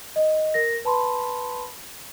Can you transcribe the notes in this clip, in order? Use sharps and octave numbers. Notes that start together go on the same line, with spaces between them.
D#5
A#4 A#6
B4 A5 B5 C6